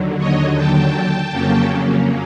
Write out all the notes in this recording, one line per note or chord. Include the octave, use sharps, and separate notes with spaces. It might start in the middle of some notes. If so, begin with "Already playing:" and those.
Already playing: D#2 D3 F#3
C#5 D#5
G5 A5
F2 C#3 F#3 A#3 C#4